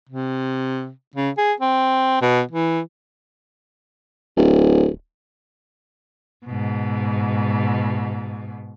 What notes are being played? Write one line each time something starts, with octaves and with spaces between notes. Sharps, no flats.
C3
C#3
G#4
C4
B2
E3
D1
G#2 B2